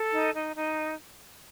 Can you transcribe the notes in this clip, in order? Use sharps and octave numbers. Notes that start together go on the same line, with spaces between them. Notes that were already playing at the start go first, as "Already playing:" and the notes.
Already playing: A4
D#4
D#4
D#4